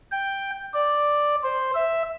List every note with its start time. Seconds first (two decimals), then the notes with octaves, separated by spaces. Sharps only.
0.12 G5
0.74 D5
1.43 C5
1.75 E5